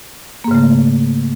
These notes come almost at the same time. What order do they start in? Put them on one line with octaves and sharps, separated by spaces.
A#3 G#2 C#3 A3